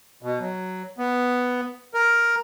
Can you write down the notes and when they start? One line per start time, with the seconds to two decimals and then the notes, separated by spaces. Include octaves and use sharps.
0.23 B2
0.40 F#3
0.98 B3
1.94 A#4